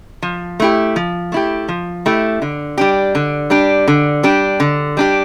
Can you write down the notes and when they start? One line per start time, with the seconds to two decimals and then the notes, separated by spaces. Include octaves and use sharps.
0.22 F3
0.60 A3 E4 G4
0.96 F3
1.32 A3 E4 G4
1.69 F3
2.06 A3 E4 G4
2.42 D3
2.78 G3 D4 G4
3.15 D3
3.50 G3 D4 G4
3.88 D3
4.23 G3 D4 G4
4.60 D3
4.97 G3 D4 G4